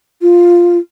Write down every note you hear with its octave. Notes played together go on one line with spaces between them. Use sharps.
F4